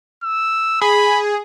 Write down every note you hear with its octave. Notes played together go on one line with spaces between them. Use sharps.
E6
G#4 B5